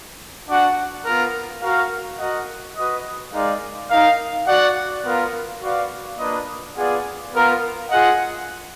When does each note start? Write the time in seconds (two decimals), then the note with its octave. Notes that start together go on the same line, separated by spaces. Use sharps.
0.48 D4 F#4 D5 F#5
1.05 B3 F4 A#4
1.62 F#4 A#4 F5
2.19 F#4 A#4 D#5 F#5
2.77 F#4 B4 D#5
3.33 G#3 D#4 A#4 D5 F5
3.90 D#4 A#4 F5
4.47 F#4 D5 F#5
5.04 B3 F4 A#4
5.61 F#4 B4 D5 F5
6.19 A#3 D4 F4 B4 D#5
6.76 B3 F4 G#4 D5 F#5
7.33 B3 F4 A#4
7.90 F4 G#4 D#5 F#5